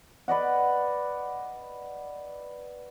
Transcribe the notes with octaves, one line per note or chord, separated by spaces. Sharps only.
B4 D5 D#5 F#5